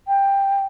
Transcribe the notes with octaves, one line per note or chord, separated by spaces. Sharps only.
G5